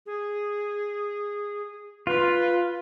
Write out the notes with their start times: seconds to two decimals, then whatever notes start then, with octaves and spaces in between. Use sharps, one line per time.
0.06 G#4
2.07 F4 B4